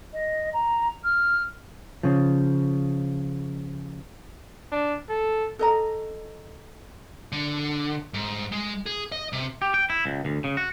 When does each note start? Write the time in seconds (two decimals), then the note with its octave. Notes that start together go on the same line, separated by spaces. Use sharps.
0.13 D#5
0.53 A#5
1.03 F6
2.03 C#3 F3
4.72 D4
5.09 A4
5.59 A4 D#5 A#5
7.32 D3
8.14 G#2
8.52 G#3
8.86 G#4
9.12 D#5
9.33 C3
9.62 G4
9.74 G5
9.90 E4
10.06 C#2
10.25 D2
10.44 C#3
10.57 F#4